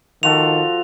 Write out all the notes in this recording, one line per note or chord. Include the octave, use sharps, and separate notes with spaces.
D#3 F3 F#4 A4 F7